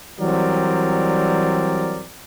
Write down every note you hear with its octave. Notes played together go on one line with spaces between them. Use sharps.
E3 F#3 G3 C4 A#4 D5